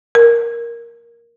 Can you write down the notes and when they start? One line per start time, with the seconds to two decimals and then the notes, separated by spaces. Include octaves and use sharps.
0.15 A#4